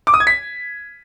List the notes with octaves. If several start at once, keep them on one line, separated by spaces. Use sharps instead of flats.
D6
D#6
G#6
B6